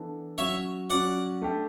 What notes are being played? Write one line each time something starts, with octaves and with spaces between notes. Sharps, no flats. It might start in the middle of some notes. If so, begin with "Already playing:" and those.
Already playing: E3 B3 D4 A4
F#3 C#4 F#4 C#5 E5
F#3 C#4 F#4 D5 F#5
A3 D4 G4